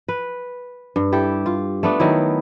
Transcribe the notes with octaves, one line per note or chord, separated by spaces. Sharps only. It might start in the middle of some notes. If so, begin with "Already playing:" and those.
B4
G2
E4 G4 A4
F4
A3 B3 D4
D#3 F#3 E4